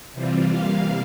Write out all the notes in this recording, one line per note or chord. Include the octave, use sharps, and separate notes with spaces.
C3 E3 G3 C4 F4
C3 E3 G3 A#3 F5